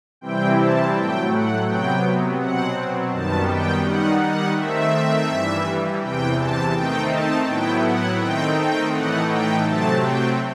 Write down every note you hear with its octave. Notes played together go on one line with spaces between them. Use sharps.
C3 E3 G3 C4 E4 G5
A5
A2 F#3 A3 G5
F#5
C3 F#3 B3 G5
B2 F#3 C4 F#5
F#2 D#3 G3 B3 A5
G5
D#3 G3 D#4 F#5
F#5
D#3 A3 C4 E5
G2 E3 G3
E2 C3 E3 G5
A5
D#3 A3 C4 D#4 G5
A5
A2 F#3 B3 E4 G5
F#5
D#3 A3 C4 D#4 G5
G5
A2 E3 A3 D#4 F#5
G5
C3 F#3 A3 C4 A5
G5